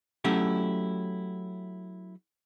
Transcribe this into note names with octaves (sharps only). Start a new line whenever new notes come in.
F#3 A3 C#4 E4 G4